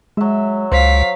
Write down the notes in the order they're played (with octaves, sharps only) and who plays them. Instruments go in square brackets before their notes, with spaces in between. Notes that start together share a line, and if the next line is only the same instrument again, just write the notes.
[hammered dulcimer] F#3 E5 [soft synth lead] G#3
[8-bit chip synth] C#2 [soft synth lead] C5 [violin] F5 B6